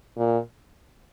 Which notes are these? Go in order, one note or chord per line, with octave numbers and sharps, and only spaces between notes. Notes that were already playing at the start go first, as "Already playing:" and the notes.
A#2